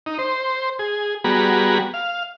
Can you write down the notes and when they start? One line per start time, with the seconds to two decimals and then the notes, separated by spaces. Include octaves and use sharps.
0.06 D#4
0.19 C5
0.79 G#4
1.24 G3 B3 F#4 G#4 A#5 B5
1.94 F5